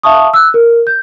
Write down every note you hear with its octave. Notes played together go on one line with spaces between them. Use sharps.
E5 F5 A5 C#6 D#6
E6 F#6
A#4
G6